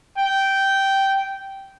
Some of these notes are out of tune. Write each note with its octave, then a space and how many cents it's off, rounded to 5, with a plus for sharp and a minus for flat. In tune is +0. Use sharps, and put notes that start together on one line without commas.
G5 -10